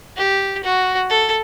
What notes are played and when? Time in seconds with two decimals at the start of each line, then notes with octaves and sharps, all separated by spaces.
0.17 G4
0.63 F#4
1.10 A4